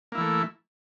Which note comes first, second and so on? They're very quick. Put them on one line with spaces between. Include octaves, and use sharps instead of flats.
A#3 E4 E3 A3